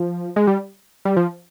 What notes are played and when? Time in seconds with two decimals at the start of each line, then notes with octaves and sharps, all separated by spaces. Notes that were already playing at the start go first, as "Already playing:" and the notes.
Already playing: F3
0.36 G#3
0.47 G3
1.05 G3
1.16 F3